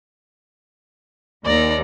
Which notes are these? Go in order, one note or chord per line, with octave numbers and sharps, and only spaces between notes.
D#2 D5 A#5